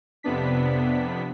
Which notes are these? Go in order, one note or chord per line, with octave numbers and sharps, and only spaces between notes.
F2 C3 B3 D4 B6